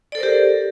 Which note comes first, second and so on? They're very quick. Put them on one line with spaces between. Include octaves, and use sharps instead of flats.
D5 A4 C5 A#4 G4